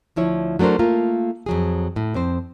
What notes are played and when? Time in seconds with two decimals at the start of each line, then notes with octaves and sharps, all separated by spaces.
0.16 D2 F3 E4 C#5
0.59 F#3 A3 D4 A#4 C5
0.79 A3 A#3 F4 A#4
1.46 F2 F#3 G#4
1.96 A2
2.14 F2 C4 C5